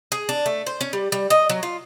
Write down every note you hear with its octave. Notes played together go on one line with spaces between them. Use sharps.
G#4
D4
A3
C5
C#4
G3
G3
D#5
F#3
F4